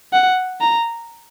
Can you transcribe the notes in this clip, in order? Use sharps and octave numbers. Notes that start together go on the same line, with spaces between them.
F#5
A#5